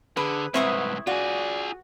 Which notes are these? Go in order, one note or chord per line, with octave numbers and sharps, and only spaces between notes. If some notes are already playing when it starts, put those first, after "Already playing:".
D3 G#4 B4
C2 G#2 C4 E4 B4 C#6 D#6
F4 F#4 G#4 D5